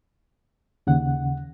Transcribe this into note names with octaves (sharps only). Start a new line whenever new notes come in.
D#2 C#3 F#5